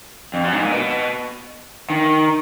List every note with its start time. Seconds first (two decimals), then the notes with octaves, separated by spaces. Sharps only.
0.34 F2
0.44 F#2
0.52 G#2
0.62 A#2
0.71 B2
1.90 D#3